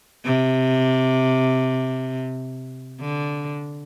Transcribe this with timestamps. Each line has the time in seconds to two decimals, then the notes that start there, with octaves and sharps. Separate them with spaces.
0.25 C3
3.01 D3